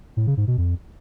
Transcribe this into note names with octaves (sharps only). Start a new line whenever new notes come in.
A2
C#3
G#2
B2
F2